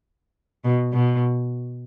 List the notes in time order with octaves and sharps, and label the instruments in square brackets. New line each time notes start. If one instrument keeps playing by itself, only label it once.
[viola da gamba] B2
B2